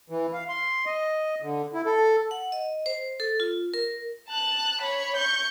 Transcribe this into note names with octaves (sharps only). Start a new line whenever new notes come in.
E3
F5
C6
D#5
D3
E4
A4
F#5
D#5
C5
A4
F4
A#4
A5 F#6
C#5 B5
C#6 G6